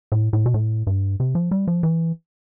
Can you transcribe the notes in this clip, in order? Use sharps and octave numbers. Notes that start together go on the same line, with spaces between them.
A2
A2
B2
A2
G2
C3
F3
G3
F3
E3